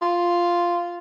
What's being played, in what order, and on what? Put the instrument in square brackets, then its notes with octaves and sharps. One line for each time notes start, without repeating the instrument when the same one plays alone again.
[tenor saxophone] F4